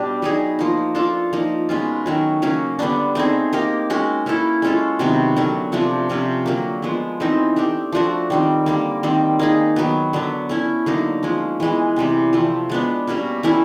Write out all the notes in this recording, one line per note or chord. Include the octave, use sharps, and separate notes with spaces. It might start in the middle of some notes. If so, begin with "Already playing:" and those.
Already playing: B2 G3 D4 G4
F#3 B3 D#4 G#4
F3 A#3 D#4
A3 D4 F4 A4
F3 A#3 D#4
B2 G#3 C#4 F4
D#3 F#3 A3 C#4
C#3 F#3 A#3 C#4
D3 G3 B3 D4
A3 C4 D#4 G#4
A#3 D#4 G4 A#4
G#3 C#4 F#4
A#3 C#4 E4 A4
G#3 C#4 F4 A4
C3 D#3 F#3 B3
D3 F#3 A3 C#4
C3 F3 A3 D4
C3 F3 A3 C#4
D3 F#3 A#3
F3 G#3 B3
E3 A3 C4 D#4
A3 D4 G4
F3 A3 D4 F#4
D#3 G3 C4
D3 G3 A#3
D#3 G3 C4
A#3 D#4 G#4
D#3 F#3 B3
D3 F#3 B3
A3 C#4 E4
D3 F#3 A#3 D#4
F3 G#3 C#4
E3 G#3 B3
C3 E3 G3
F3 A3 C4
G#3 B3 D4
B2 G3 A#3 C#4
E3 A3 C#4 E4